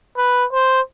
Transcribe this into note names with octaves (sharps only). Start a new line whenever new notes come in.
B4
C5